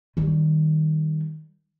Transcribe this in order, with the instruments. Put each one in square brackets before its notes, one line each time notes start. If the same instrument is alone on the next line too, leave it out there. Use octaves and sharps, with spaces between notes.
[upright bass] D#3 G3